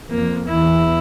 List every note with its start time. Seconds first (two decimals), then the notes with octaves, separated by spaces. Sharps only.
0.10 F2 A#3
0.48 E2 E4